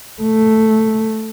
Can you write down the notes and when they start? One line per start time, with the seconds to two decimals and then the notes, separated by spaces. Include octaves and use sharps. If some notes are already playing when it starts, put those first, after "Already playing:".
0.22 A3